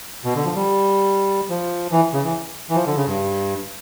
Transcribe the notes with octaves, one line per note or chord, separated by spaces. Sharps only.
B2
D3
F3
G3
F3
E3
C#3
E3
E3
F3
D3
C#3
G2